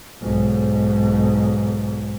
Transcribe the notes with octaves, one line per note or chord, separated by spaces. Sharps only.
B1 G#2